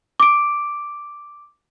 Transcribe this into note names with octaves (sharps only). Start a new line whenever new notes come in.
D6 D7